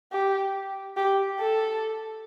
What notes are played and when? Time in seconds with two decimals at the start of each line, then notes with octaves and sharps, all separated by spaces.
0.12 G4
0.97 G4
1.40 A4